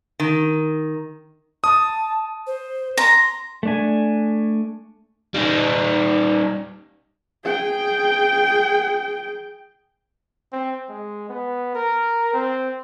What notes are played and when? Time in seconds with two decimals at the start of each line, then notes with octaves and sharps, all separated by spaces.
0.20 D#3
1.64 A5 D#6
2.47 C5
2.97 A#5 C6
3.63 A3 D4 G#5
5.34 G3 D#4
7.45 G#4 G5
10.52 C4
10.89 G#3
11.29 B3
11.75 A#4
12.34 C4